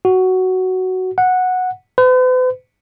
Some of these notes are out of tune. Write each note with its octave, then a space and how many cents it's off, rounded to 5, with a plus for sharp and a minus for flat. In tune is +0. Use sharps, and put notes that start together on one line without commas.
F#4 +10
F#5 -10
B4 +45